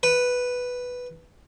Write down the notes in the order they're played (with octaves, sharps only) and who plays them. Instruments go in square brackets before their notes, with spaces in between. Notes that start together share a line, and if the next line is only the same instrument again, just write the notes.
[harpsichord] B4